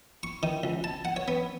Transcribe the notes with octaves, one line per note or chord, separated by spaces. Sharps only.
C#6
D#3
C#2
A5
F#5
C#5
B3